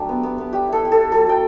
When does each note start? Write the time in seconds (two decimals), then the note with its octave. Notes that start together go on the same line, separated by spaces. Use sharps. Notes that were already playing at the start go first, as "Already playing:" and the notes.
Already playing: F#3 A3 D4 G4
0.09 B3
0.23 B3
0.38 B3
0.53 G3 G4
0.67 E4
0.72 A4
0.83 E4 G4
0.92 A4
0.97 E4
1.12 F#3 A4
1.27 F#3 G5